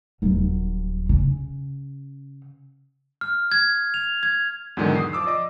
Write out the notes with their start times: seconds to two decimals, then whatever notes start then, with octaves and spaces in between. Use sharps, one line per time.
0.22 D#1 F#3
1.09 C#3
3.21 F6
3.52 G#6
3.94 F7
4.23 G#6
4.77 E2 G#2 B2 D3 D#3 F#3
4.96 D#6 C7
5.13 F3 D6 E6
5.26 D5 D#5 D6